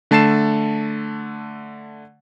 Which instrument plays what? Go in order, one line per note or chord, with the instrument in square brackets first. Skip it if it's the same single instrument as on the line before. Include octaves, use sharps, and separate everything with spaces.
[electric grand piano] D3 A3 A5 A6 C7 E7